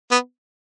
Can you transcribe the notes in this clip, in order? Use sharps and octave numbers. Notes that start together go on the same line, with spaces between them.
B3